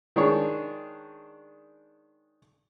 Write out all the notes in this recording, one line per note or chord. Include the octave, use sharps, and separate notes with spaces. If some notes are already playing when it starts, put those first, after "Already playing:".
D#3 G#3 D4 C#5